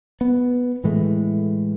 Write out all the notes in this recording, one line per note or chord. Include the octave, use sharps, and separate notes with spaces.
B3
A2 E3 G#3 A3